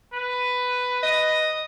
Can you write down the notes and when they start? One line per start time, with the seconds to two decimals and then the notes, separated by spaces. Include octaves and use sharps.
0.14 B4
1.03 D#5